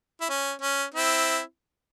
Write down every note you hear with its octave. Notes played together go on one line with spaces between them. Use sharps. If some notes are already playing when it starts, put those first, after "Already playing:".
E4
C#4
C#4
C4 E4